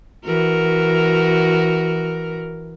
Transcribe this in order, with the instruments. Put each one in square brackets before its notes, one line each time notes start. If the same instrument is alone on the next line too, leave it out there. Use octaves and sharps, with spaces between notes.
[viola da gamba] E3 F#4 A#4